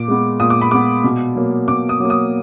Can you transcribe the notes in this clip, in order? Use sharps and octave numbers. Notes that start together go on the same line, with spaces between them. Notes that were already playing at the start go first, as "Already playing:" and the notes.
Already playing: A#2 D6
G#3 B3
A#2 D#6
D6
B5
G#3 B3 D6
B2
F#3 A#3
B2 D6
D#6
F#3 A#3
D#6